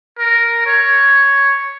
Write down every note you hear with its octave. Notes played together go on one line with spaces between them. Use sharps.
A#4
C#5